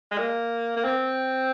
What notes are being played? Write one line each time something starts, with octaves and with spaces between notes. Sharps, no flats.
G#3
A#3
A#3
C4